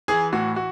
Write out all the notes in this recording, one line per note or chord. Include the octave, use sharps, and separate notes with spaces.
E3 G#4
A2 F#4
F#4